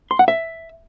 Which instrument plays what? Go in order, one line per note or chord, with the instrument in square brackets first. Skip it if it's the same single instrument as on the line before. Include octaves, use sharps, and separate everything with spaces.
[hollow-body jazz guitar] C6
F#5
E5